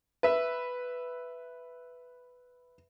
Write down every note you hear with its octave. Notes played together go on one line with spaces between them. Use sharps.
B4 E5